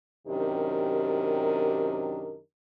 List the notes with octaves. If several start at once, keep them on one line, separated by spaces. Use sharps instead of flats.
F#2 C3 D#3 D4 G4 A#4